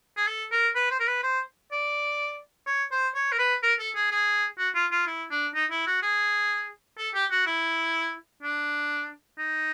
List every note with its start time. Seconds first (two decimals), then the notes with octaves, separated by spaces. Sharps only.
0.17 G#4
0.28 A4
0.52 A#4
0.75 B4
0.91 C5
1.00 A#4
1.07 B4
1.23 C5
1.72 D5
2.67 C#5
2.92 C5
3.14 C#5
3.32 A#4
3.39 B4
3.63 A#4
3.79 A4
3.96 G#4
4.12 G#4
4.58 F#4
4.75 F4
4.91 F4
5.07 E4
5.31 D4
5.54 D#4
5.71 E4
5.87 F#4
6.02 G#4
6.98 A4
7.15 G4
7.31 F#4
7.46 E4
8.43 D4
9.38 D#4